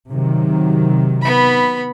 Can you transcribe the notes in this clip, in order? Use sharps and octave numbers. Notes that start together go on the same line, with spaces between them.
C3 D#3 F#3
B3 B5